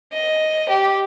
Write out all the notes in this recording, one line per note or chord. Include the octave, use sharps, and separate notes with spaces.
D#5
G4